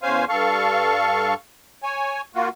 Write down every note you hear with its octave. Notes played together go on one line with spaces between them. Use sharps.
E2 C#4 C5 F5 G#5
G2 A4 F5 C#6
C#5 G#5
A#3 F4 F#4